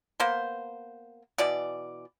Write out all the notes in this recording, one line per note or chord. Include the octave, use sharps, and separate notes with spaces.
A#3 B3 C5
B2 E3 D5